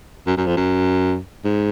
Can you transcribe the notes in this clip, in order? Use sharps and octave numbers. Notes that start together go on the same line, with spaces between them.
F#2
F#2
F2
F#2
G#2